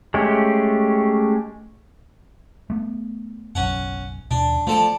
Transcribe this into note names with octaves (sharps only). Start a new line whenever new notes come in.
G#3 A3 C#4 G4
A3 B3
F#1 B1 C#4 F#5
D#2 B2 D4
F3 A3 A4 D5